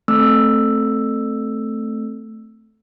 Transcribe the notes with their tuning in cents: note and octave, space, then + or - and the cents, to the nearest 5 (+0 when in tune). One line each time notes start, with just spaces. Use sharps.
A3 +0 C4 +0 E6 +5